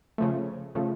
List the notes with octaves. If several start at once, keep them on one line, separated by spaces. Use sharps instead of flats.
C#3 F3 A3
C#3 F3 A3